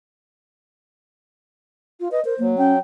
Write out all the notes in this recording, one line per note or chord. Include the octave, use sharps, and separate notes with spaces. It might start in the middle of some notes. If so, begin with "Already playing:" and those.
F4
B4 D#5
A#4 C5
F#3 A#3
C#4 G5